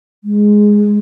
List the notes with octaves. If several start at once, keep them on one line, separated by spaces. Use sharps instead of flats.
G#3